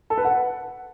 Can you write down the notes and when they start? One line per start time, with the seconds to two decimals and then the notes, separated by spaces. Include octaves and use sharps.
0.10 A4
0.17 B4
0.25 F#5